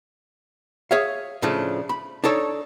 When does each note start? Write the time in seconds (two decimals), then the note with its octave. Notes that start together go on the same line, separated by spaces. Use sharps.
0.91 G#4 C#5 E5 F5
1.42 A2 C#3 F3 A3 D4
1.89 B5
2.24 D4 D#4 A4 C#5